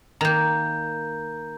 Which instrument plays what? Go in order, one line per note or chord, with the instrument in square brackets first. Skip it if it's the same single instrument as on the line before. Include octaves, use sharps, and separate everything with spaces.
[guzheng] D#3 A#3 [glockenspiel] A#5 G6